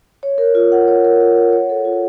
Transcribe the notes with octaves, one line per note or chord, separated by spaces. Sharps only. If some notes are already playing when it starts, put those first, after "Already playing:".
C#5
A#4
F4
F#5
C#5
A#4
F4
F#5
C#5
A4
F4